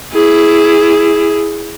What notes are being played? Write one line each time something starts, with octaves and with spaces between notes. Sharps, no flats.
E4 G#4